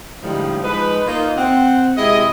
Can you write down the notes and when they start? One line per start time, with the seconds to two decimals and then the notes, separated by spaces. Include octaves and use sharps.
0.22 A2 D3 F3 G3 G#3 D#4
0.63 F3 G#3 D#4 B4
1.06 A#3 D#4 F4
1.36 C4 F#5
1.97 C3 G#3 E4 G#4 D#5